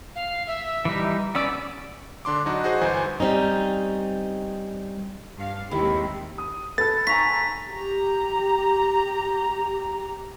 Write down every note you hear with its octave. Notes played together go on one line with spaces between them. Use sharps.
F5
E5
E3 G3 D#4
B3 C#4 D5 E6
D3 D4 C6 D6
F#3 D4 D#4 F#4
D#4 F#4 G#4 C5
G1 E3 C5 G#5
G3 C4 C#4 D#4
G2 F5
D#2 D#3 G#3 C4 E4 G4 B5
D#6
A4 B4 A6
G#5 A#5 C#6 B6
G4 A#5